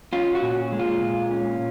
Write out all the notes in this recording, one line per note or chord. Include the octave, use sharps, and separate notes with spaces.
C#4 F4
F#4
A#2
G#3
F4
A#2
C#4